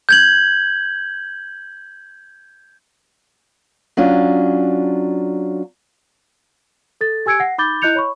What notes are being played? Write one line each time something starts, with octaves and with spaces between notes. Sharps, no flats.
G6 G#6 F#7
F#3 C#4 D4 F4
A4 A6
G4 G#5 E6 G#6 C#7 D7
F#5 A#6 C7
D#4 B5 D6 G6 A6 G7
E4 D#5 F#6 G6 C#7 F7
C#5 B5 C#6